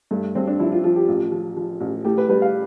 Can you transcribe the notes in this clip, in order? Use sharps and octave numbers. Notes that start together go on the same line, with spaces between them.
G2 A3
G2 C4
D4
F3 E4
F4
F3 F4
G4
A1 F4
F3
F3
A1
A2 G4
B4
G3 B4
F5